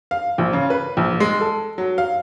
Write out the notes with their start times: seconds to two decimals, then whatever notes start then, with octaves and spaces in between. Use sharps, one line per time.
0.11 F5
0.38 A#1
0.53 C#3
0.70 B4
0.97 A#1
1.20 G#3
1.41 A4
1.78 F#3
1.98 F5